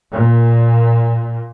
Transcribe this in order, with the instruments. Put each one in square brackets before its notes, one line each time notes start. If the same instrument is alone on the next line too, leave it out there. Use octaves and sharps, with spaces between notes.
[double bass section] A#2